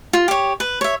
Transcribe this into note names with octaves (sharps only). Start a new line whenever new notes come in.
F4
G4 C#5
B4
C#5 E5